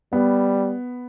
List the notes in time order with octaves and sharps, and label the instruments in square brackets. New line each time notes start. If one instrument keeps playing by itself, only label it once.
[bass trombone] G3 [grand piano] B3